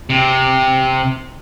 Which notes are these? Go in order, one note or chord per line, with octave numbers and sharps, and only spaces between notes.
C3